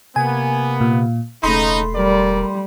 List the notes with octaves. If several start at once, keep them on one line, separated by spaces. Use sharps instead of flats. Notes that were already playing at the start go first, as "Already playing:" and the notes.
C3 A#3 B3 G#5
A#2
E1 C#3 A3 D#4 B5 C6
G3 A#4 D5